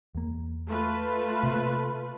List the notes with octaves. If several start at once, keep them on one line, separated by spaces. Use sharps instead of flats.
E2 A#3
A3 F4 B4
C3 A#3